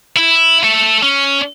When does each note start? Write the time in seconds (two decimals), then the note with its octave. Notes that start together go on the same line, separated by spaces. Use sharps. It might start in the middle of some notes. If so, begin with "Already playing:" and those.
0.17 E4
0.64 A4 E5
1.03 C#4